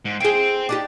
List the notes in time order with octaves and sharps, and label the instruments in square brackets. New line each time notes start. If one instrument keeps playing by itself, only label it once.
[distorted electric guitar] G#2
[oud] E4 G#4 [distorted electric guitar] C5 G5
[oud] D4 D#4 G4